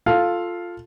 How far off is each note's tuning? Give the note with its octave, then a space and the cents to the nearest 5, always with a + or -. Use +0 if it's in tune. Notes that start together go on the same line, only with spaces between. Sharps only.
F4 +0 A4 +0 F5 +0